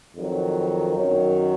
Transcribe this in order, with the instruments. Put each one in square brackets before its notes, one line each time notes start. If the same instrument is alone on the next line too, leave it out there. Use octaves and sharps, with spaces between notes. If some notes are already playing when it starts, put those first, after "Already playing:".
[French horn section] F2 D#3 F#3
F#2 D#3 F#3 C#5